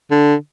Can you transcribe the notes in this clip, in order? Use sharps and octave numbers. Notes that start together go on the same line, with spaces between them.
D3